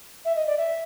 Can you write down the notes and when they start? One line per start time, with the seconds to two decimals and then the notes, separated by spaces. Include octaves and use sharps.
0.25 E5
0.35 D#5
0.47 D5
0.57 E5